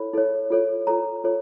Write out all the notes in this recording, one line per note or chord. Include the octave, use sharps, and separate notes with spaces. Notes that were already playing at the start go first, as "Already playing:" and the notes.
Already playing: E4 A4 C#5 B5
E4 A4 C#5
F4 A4 C#5
F4 A4 C#5 A#5
F4 A4 C#5